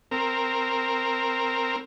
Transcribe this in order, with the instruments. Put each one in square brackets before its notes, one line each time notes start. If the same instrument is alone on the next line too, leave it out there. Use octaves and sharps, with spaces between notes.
[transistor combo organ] C4 A#4